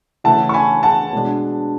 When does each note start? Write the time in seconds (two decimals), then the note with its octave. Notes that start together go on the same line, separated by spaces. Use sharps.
0.24 C#3 E3 A3 E4 F#5 A5
0.49 C#6
0.54 G#5 B5
0.83 F#5 A5
1.13 B2 G#3 D4